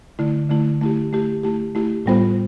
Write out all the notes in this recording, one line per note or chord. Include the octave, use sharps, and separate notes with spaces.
D3 A3 E4
D3 A3 E4
A3 E4 G4
A3 E4 G4
A3 E4 G4
A3 E4 G4
A2 G3 B3 F4 C5